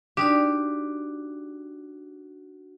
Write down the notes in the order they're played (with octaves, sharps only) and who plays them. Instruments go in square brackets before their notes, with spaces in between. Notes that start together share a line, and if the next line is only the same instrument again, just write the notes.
[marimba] D4 D#4 D5 [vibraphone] F#4 [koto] G4